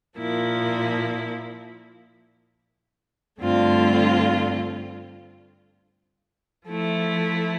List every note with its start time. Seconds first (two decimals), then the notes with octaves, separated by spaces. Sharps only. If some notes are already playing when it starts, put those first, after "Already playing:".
0.17 A#2 F3 A#3 E4
3.41 G2 D3 A3 C4 F4
6.65 F3 A3 E4